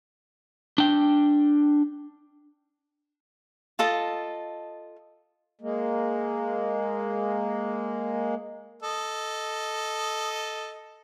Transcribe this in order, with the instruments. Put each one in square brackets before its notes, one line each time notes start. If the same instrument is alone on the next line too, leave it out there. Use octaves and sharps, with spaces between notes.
[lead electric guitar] D4 G5
[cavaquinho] F4 A4 D#5 A5
[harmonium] G#3 A#3
[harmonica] A4 D#5